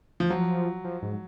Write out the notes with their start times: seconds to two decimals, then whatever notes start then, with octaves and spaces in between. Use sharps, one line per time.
0.20 F3
0.30 F3 F#3
0.84 F3
1.02 G#2